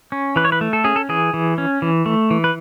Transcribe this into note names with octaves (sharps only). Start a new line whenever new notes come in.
C#4
E3 B4
C#5
B4
A3
A4
C#4 G#4
A4
E3 G#4
E3
C#4
E3
A3
E3
B4